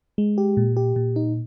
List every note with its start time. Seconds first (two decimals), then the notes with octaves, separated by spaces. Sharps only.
0.18 G#3
0.38 G4
0.57 A#2
0.77 G4
0.96 A#2
1.16 D#4